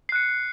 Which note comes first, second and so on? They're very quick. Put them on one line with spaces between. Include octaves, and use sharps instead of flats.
C7 F#6 C#7